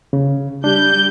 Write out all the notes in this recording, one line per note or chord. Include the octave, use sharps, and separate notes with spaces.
C#3
G3 D4 G6